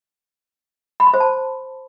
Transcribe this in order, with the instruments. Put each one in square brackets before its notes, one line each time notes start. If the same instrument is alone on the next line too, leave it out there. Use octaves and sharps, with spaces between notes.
[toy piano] B5
C6
C5
A5